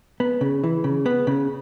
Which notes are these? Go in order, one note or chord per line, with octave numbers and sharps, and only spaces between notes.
B3
C#3
E3
C#3
B3
C#3